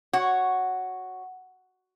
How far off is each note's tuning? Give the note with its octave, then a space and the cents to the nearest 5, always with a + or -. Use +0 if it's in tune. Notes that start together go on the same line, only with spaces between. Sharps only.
F#4 +0 C#5 +0 F#5 +0